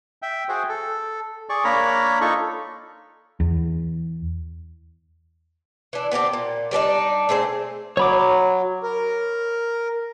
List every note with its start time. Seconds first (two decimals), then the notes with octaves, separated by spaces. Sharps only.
0.22 E5 G5
0.49 F#4 G#4 C5 G5
0.69 A4
1.49 G#4 D5 C#6
1.64 A#3 D4 A#4 C#5 A#5 B5
2.21 D#4 F4 A4 C#6
3.40 E2
5.93 E3 D4
6.11 B3 C4 D4 G4
6.33 A#2
6.71 G3 C4 D4 D#4
7.29 A3 C4 G#4 C5
7.97 F#3 C#5 B5 D6
8.83 A#4